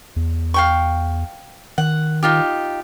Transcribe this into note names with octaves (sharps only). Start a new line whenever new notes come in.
E2
F5 G5 C#6
D#3 F#5
D#4 F4 G4